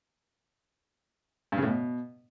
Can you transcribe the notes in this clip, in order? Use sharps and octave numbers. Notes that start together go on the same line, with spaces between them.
G2
C#3
A2
B2